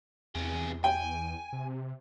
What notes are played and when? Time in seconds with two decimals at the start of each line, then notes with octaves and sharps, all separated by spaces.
0.35 E2 C3 G#4
0.84 G5 G#5
1.53 C3